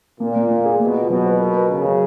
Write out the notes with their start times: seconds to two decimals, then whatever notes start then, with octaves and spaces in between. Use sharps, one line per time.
0.20 A#2 A#3
0.36 A#3
0.50 A#3
0.65 G#4
0.80 B2 A#3
0.96 F4
1.10 B2 F#3
1.25 B4
1.40 A#4
1.56 A#4
1.69 C#3 A#4
1.84 F#3